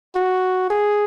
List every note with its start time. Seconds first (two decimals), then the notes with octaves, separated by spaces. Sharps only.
0.16 F#4
0.70 G#4